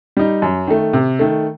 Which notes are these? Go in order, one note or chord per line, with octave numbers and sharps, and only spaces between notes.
G3 D#4
F#2
D#3 A3
C3
D#3 A3